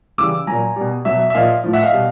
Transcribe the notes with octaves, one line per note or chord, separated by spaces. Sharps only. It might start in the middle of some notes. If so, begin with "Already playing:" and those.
C#3 E3 G3 D6 E6
A#2 F#3 G#5 A#5
B2 G3
B2 F#3 E5
E5
E5
A#2 F3 D#5 F5
A2 F3
E5 F#5
D#5 F5
B2 G3